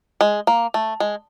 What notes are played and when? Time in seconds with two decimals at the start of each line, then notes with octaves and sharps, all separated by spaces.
0.21 G#3
0.47 A#3
0.74 A3
1.00 G#3